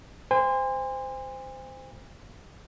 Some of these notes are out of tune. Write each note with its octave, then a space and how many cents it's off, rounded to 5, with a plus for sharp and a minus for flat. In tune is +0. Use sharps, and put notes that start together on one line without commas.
C5 -15 G#5 -45